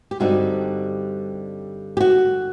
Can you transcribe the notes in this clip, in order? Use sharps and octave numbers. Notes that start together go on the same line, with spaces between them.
G4
G2 D3 G3 C4 D#4 F#4
G4
F#4